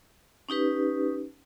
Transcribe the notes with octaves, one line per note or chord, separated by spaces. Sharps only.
C#4 D#4 G4 B4